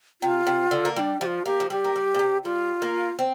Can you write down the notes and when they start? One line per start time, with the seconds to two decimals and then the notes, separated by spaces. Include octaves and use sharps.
0.22 C3 F4
0.47 C3
0.71 D3
0.85 A#3
0.96 G3 D4 F4
1.21 F3 F4 G4
1.46 A#3 G4
1.60 F3
1.70 G3 G4
1.84 A#3
1.96 G3
2.14 A#2
2.19 C3
2.44 G3 F4
2.82 A#3
3.19 C4